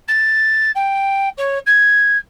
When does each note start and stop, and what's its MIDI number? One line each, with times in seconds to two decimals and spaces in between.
0.08 0.71 93
0.75 1.29 79
1.37 1.59 73
1.66 2.17 92